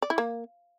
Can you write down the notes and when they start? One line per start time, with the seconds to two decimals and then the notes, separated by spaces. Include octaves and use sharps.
0.02 D5
0.10 E4
0.18 A#3